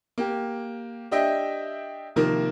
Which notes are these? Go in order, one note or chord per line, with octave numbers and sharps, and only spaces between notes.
A#3 G4
D4 G4 D#5 E5 G5
C3 D#3 F3 A#3 A#4